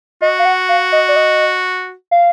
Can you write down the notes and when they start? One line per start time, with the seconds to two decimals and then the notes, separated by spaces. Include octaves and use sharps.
0.22 F#4 D#5
0.39 F5
0.45 F#5
0.69 F5
0.92 D#5
1.08 D5
1.16 D#5
2.11 F5